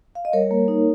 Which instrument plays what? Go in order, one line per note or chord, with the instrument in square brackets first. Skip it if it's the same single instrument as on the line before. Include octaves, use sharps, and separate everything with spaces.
[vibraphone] F5
D#5
G3 A#4 C#5
A#3
D#4